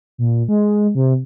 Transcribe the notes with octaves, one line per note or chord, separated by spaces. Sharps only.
A#2
G#3
C3